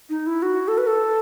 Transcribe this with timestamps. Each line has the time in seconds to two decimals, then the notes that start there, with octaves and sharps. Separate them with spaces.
0.10 D#4
0.27 E4
0.42 F#4
0.68 A4
0.78 B4
0.87 A4